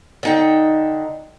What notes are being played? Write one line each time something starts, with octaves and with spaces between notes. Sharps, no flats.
D3 D#4 G5